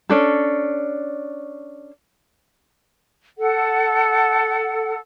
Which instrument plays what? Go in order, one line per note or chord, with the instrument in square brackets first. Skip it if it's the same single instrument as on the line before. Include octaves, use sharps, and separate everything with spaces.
[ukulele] C#4 D4 A4
[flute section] A4 F#5